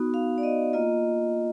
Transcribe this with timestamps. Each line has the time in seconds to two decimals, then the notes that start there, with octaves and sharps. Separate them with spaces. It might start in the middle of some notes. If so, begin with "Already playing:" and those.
Already playing: B3 D#4 F#4
0.14 F5
0.38 D5
0.43 D#5
0.73 A#3 F4 D#5